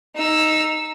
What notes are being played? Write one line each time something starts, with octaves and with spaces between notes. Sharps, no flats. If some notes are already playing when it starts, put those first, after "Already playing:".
D#4 E6